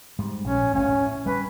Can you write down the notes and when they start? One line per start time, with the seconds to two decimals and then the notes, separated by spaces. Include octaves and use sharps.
0.19 G#2 G3
0.44 A#1 C#4
0.73 G1 D2 C#4
0.88 A2
1.26 G3 C#4 B4